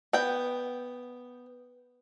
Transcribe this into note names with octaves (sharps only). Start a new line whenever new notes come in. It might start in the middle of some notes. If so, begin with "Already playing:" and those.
B3 G5